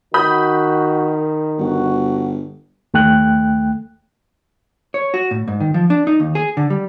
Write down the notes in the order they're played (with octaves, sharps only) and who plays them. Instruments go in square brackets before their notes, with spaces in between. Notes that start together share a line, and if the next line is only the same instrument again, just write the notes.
[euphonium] D#3 [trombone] F#4 [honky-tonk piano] B5 D#6 G6
[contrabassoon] G1 [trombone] F#4
[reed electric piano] D#2 A3 G5 F#6
[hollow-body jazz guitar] C#5
F#4
A2
G#2
D#3
F3
D4
D#4
D#2
G#4
D3
G3